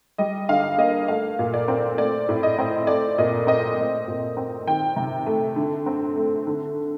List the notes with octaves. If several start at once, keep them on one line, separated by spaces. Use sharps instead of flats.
G3 D#5
D3 F5
A#3 D#5
A3 F5
A#2
D5
C4
A3 D5
A2
D#5
C4
A3 D5
A#2 D#5
C4 D#5
A3
A#2
C4
D#3 G5
C3
A3
D3
C4
A3
D3